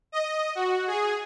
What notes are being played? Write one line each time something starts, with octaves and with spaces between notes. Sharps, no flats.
D#5
F#4
G#4